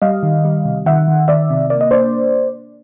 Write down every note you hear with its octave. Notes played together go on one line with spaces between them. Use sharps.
G3 D#5 F5
D#3
G3
C3
D#3 E5 F#5
D#3
D#3 D5 E5
C3
A#3 D5
D#5
D4 C5 D5